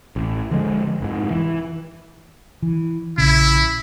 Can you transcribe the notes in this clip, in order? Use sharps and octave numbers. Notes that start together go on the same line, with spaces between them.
A1
D3 F3 G#3
F1 G#2
E3
E3
A#1 C#3 E4